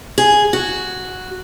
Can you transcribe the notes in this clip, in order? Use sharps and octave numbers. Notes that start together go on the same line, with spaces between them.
G#4
F#4